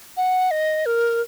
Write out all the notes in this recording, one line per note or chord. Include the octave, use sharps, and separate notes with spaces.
F#5
D#5
A#4